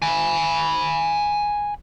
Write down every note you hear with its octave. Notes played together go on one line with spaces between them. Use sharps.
G#5 B5